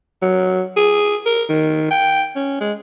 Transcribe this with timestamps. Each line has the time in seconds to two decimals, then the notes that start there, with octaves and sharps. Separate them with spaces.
0.22 F#3
0.76 G#4
1.26 A#4
1.49 D#3
1.91 G5
2.36 C#4
2.60 G#3